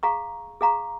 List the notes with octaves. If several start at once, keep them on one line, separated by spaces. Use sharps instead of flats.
G#4 F5 A#5 C#6
G#4 F5 A#5 C#6